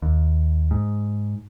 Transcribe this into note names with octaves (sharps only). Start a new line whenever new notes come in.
D#2
G#2